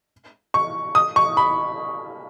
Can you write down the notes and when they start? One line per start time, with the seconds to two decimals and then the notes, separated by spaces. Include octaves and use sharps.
0.54 C#6
0.95 D#6
1.16 C#6
1.37 B5